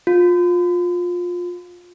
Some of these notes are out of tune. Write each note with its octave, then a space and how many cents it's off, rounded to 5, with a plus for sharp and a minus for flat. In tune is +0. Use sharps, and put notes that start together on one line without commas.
F4 +20